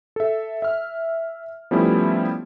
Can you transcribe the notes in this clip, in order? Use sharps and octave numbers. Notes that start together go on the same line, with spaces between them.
A4 E5
E5 F6
F3 G3 A3 B3 C#4 E4